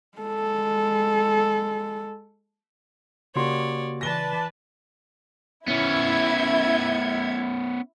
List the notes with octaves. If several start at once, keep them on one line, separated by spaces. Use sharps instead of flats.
G#3 A4
C#3 A#3 F#4 G4 C#5 D5 C6
E3 B4 D5 A5 A#6 G7
B3 C#4 E4 E5 G#6